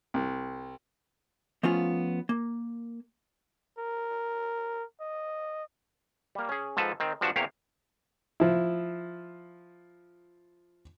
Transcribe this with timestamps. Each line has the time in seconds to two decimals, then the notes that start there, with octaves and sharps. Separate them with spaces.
0.14 C2
1.63 F3 A3 B3 C#4 F4
2.29 A#3
3.78 A#4
5.01 D#5
6.35 G3 A#3
6.49 C#4 G#4
6.77 G#2 F3 A4 B4 A5
7.00 D#3 C4
7.21 G2 F3 D4 F#4 F#5 A5
7.36 E2 C3 A#3 G4 C#5 F5
8.40 F3 E4